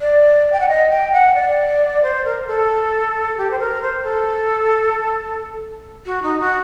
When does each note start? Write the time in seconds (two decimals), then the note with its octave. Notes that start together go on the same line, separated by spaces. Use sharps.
0.01 D5
0.52 G5
0.60 F#5
0.68 D#5
0.90 G5
1.13 F#5
1.35 D5
2.03 C5
2.25 A#4
2.47 A4
3.37 G4
3.51 C5
3.60 A#4
3.82 C5
4.04 A4
6.06 F#4
6.23 D#4
6.40 F#4